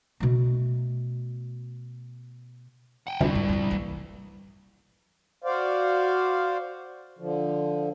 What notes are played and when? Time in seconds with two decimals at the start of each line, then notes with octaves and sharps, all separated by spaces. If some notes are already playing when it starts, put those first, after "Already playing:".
0.20 B2 A3
3.07 F#5 G5
3.21 F1 D2 G3 C4 E4
3.35 G#2
3.49 F2 D3
3.71 E3 A#3
5.44 F#4 C5 D5 F5
7.19 D3 F3